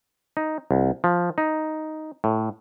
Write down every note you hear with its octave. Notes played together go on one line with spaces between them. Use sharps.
D#4
C2
F3
D#4
A2